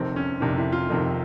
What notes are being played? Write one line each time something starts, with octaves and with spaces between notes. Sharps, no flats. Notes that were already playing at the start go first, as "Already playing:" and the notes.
Already playing: F1 F2 C3 D#3 C4
C#4
F1 F2 C3 D#3 D4
E4
F4
F1 F2 C3 D#3